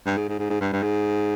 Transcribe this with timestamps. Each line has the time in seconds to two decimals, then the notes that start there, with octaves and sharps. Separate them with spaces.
0.06 G2
0.17 G#2
0.29 G#2
0.39 G#2
0.50 G#2
0.61 G2
0.73 G2
0.83 G#2